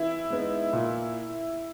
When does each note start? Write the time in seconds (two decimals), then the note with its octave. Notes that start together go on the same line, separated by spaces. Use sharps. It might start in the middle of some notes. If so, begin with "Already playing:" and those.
Already playing: E3 E4
0.30 G#3 B3 D#4
0.73 A#2